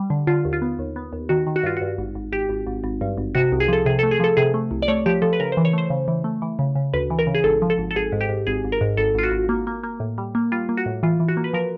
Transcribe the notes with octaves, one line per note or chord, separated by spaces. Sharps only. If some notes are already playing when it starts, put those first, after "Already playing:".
Already playing: G3
D3
D3 F4
D#2
F4
B3
D#2
B3
D#2
D#3 F#4
D#3
F#4
G2 F4
G2 F#4
G#1
G#1
G#1 G4
G#1
G#1
G#1
G2
G#1
C3 F#4
C2
G#4
F3 A4
C3 G#4
A3 A4
G#4
F3 A4
C3 G#4
A3
C2
D5
A3 C#5
F3 G4
F3 A4
B4
C#3 A#4
C5
E3
C#5
A3 C5
C#3
E3
A3
E3
C#3
C#3
D2 B4
E3
A#4
C#3
G#4
G#1 A4
F3
A4
G#1
A4
G#1 G#4
G#2
G4
G#2
G#1 G#4
G#1
A#4
G#2
G#1 A4
G#1 F4
F#4
G#1
A#3
A#3
A#3
A2
G3
A#3
G3 F4
A#3
F#4
A2
E3 F4
E3
F#4
A#3
B4
F3 A#4